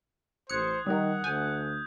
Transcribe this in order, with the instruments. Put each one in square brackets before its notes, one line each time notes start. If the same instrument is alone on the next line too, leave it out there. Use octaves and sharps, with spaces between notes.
[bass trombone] A1 [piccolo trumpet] C5 [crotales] D#6 F#6 G#6 [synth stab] C#7
[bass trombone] D#3 [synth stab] G3 A#4 [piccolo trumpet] F#5 [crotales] D#6
[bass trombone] D2 [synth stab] G#5 [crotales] G6